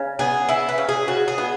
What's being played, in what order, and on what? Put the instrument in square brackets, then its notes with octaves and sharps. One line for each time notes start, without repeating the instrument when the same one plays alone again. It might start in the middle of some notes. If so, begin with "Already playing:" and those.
Already playing: [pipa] C#3
[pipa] B3 [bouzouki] G#4
[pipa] E3 [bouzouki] E4
[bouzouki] B4
[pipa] C#3
[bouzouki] G#4
[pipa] C#3 [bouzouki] F#4
[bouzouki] G#4
[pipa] B3